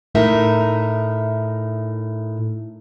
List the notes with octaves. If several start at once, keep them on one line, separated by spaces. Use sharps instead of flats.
A2 D#4 A#4 E5